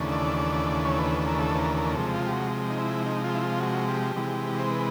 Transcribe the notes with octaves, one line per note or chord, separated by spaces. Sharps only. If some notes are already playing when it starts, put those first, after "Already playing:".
Already playing: D#2 C#3 E3 A3 D4
D5
C#5
B4
B4
A#4
A4
B4
A#4
A#4
C3 F3 G#3 A4
F4
G4
F#4
D#4
E4
D#4
F4
E4
F4
F#4
G4
C3 E3 G#3
C5
B4